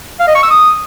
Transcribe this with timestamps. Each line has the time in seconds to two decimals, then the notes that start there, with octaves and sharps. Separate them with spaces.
0.20 F5
0.27 D#5
0.35 C#6
0.43 E6
0.50 D#6